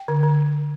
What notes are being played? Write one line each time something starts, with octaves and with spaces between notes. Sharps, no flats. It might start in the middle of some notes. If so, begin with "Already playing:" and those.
Already playing: G5
D3
D3